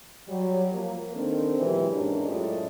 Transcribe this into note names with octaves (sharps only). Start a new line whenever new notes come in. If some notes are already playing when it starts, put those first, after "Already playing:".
F#3 G3 C#5
F3 A#3
D#3 C4 D4 A4 A#4 C5
B2 E3 F#3 G#3 F4 G4
E2 G#2 C#4 D4 G4 A#4
F#2 A2 G#3 F4 D5 D#5